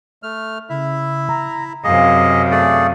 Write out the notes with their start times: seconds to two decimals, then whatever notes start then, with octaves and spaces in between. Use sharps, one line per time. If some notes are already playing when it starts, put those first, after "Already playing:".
0.23 A3 F6
0.69 C#3 E4 E5
1.29 A#5
1.84 F#2 C3 G#4 D#5 F5
2.51 A3 G#4 D5